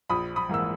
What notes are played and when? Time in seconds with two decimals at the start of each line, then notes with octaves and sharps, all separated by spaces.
0.10 A#1 B5 D#6
0.36 B5 D#6
0.49 G#2 E3 A#3 E6